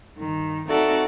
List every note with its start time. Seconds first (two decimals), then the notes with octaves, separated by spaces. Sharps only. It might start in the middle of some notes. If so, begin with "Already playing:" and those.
0.16 G2 D#3
0.69 C4 D#4 F#4 A4 D5 E5